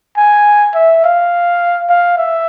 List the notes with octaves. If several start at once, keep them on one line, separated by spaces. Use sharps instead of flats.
G#5
E5
F5
F5
E5